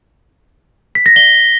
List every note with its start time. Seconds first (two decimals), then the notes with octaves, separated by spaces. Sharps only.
0.95 B6
1.06 A#6
1.16 G7